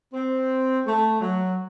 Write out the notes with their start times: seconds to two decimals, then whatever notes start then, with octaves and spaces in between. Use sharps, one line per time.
0.14 C4
0.86 A3
1.21 F#3